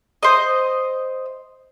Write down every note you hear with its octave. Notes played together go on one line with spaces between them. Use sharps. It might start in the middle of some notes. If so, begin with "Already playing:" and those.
C5 D#5